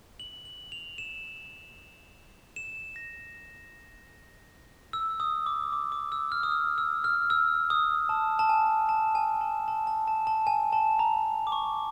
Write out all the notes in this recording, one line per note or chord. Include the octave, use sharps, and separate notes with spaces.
F#7
F#7
F7
E7
E7
A#6
E6
D#6
D6
D6
D6
E6
F6
D#6
E6
E6
F6
E6
D#6
A5
A5
G#5
A5
G#5
A5
A5
A5
A5
A5
G#5
A5
A#5
D6
C#6